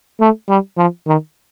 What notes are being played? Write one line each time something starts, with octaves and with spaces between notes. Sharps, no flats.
A3
G3
F3
D#3